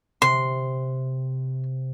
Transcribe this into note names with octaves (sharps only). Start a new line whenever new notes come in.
C3 C6